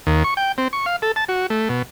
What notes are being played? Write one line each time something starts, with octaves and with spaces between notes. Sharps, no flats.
D#2
C#6
G5
C4
C#6
F5
A4
A5
F#4
A3
B2